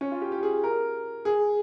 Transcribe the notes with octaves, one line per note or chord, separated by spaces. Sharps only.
C#4
F4
G4
G4
G#4
A#4
G#4